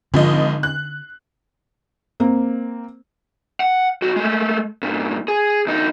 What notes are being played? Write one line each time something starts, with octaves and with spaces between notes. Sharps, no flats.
G#1 D3 F3 D#5
F#6
A#3 C4
F#5
B1 F#4
G#3 A3
G2 A#2
G#4
D2 D#4